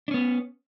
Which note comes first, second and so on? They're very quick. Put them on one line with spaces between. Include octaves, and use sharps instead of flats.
D4 C#4 B3